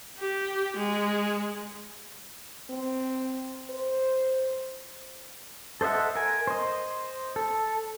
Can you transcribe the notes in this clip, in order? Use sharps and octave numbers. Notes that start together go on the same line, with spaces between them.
G4
G#3
C4
C5
A4 C5 D#5 E5 F#5
A#4 G#5
C5 D#5
A4